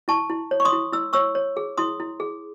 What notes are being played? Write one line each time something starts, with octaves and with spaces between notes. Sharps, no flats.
E4 A5 C#6
E4
C#5
C#6
C6 D#6
E4
E4 E6
C#5 C#6 E6
C#5
G#4
E4 C6 D#6
E4
G#4